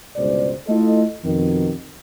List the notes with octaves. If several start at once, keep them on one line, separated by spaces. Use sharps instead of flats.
G1 C#2 B2 G#3 C5 D5
A3 E4 F4 A4 D#5
F2 B2 D#3